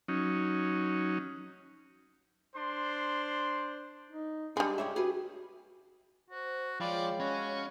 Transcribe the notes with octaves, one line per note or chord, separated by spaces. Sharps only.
F#3 C#4 D#4
D4 C5 C6
D#4
G3 G#3 D4 G#4
G4 G#4 C#5 E5
F#4 G#4 B4
F#4 C5
F3 G#3 C#5 D5 F5 G5 B5
C#4 F#4 D#5 F5 B5